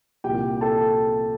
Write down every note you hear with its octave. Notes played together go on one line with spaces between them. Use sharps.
C2 A#2 G4 G5
G5
A4 A5